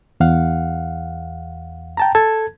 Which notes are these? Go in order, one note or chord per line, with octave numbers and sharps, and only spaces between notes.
E2 F5 F#5
G5 A5 A#5
A4 A5 G#6